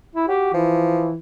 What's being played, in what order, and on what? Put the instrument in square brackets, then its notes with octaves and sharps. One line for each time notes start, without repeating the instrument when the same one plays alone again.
[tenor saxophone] E4
[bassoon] F#4 [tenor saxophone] G4
[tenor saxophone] E3 [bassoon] F3